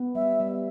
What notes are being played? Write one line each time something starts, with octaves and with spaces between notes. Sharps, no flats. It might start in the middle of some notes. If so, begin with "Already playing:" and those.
Already playing: B3
G3 E5
G3